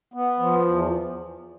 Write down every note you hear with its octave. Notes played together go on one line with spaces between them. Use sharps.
B3
F3
E2